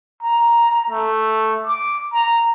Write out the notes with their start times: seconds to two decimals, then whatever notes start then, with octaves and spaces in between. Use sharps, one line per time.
0.23 A#5
0.90 A3
1.67 D6
2.14 A#5